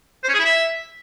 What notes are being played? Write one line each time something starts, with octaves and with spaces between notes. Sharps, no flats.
C5
C#4
G#4
E4
E5